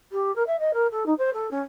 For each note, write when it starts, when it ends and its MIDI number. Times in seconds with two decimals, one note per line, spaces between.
0.12 0.34 67
0.35 0.43 70
0.47 0.59 76
0.59 0.71 75
0.73 0.87 70
0.91 1.06 69
1.06 1.13 63
1.18 1.30 72
1.33 1.48 69
1.51 1.61 61